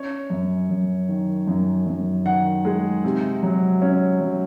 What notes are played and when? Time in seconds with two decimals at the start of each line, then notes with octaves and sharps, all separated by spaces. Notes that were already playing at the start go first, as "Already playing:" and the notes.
Already playing: C#4 C#5
0.30 F#2
0.69 F#2
1.09 D#3
1.47 F#2
1.86 F#2
2.26 D#3 F#5
2.65 G#3
3.04 C3
3.43 F#3
3.82 C#4
4.21 F#3